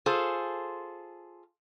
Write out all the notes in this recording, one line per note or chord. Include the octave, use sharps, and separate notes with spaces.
F4 G#4 A4 C5